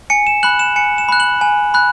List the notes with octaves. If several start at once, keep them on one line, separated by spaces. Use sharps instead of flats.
G#5 C#7
E7
B5 F#6 F#7
E7
G#5 C#7
E7
B5 F#6
F#7
G#5
B5 F#6